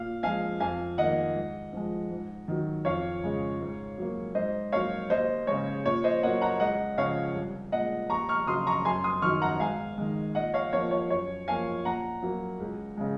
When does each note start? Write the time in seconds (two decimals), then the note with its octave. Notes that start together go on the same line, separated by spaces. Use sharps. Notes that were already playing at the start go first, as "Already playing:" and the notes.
Already playing: A#2 F5
0.23 F3 G#3 F5 G#5
0.60 F2 F5 G#5
0.98 D#3 A#3 D#5 F#5
1.36 G#2
1.73 F3 G#3
2.11 G#2
2.48 D#3 F#3
2.85 F2 C#5 F5
3.24 C#3 G#3
3.60 G#2
3.98 F#3 A#3
4.35 G#2 C5 D#5
4.72 F#3 A#3 C#5 F5
5.10 D#2 C5 D#5
5.47 C#3 G#3 C#5
5.85 A#2 C#5
6.04 C5 D#5
6.23 F#3 A#3 D#5 F#5
6.41 F#5 A#5
6.60 C#2 D#5 F#5
6.98 C#3 F3 C#5 F5
7.35 C2
7.72 A#2 G#3 D#5 F#5
8.10 D#2 A#5 C#6
8.29 C#6 F6
8.47 C#3 F#3 C6 D#6
8.67 A#5 C#6
8.85 F#2 G#5 C6
9.04 C6 D#6
9.22 D#3 F#3 C#6 F6
9.42 F#5 A#5
9.60 G#2 F5 G#5
9.98 D#3 G#3
10.35 A#2 D#5 F#5
10.54 C#5 F5
10.73 F3 A#3 C#5
10.91 C#5
11.10 F#2 C#5
11.48 F3 A#3 F5 G#5
11.85 A#2 F#5 A#5
12.22 F#3 A#3
12.60 C#2
12.97 C#3 G#3